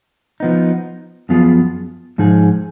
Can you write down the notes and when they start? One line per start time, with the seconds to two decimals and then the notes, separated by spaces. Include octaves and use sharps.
0.40 F3 B3 D#4
1.29 F#2 F3 B3 F4 G#4
2.18 G#2 F3 D#4 G#4